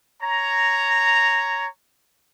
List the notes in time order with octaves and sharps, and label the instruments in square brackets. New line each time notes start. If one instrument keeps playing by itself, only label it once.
[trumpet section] C#5 A#5